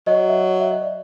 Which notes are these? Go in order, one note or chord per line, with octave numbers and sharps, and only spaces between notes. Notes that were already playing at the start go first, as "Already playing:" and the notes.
F#3 D#5
E5
D#5
E5
D#5
D5